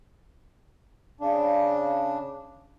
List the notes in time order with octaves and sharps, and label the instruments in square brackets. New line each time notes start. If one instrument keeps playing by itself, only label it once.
[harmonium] C#3 D4